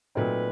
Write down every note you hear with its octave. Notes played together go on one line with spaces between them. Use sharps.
A#2 F#3 A3 C4 D#4 B4